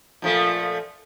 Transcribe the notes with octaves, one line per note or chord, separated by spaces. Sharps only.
A#2 F3 A3